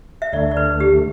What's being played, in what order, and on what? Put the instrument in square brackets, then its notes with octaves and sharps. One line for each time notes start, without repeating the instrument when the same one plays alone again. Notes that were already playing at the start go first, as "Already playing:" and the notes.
[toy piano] E5
[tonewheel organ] D2 D3 A3 [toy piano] D5
[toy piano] D5
B4
G4